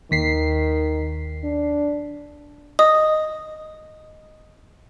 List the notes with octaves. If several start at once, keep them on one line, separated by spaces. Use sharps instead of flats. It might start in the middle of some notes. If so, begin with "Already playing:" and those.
D#2 D#3 B6 C7
D4
D#5 D#6